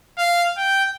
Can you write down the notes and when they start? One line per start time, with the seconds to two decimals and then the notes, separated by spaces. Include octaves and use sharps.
0.18 F5
0.57 G5